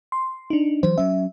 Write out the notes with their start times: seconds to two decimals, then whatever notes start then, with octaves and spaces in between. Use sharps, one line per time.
0.12 C6
0.50 D4 D#4
0.83 E3 F#3 C5
0.98 F#3 C#4 E5